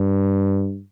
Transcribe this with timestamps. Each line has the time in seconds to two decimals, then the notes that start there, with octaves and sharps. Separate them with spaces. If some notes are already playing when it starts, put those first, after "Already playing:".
Already playing: G2